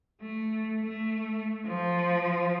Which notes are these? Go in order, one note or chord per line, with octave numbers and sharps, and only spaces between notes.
A3
A3
F3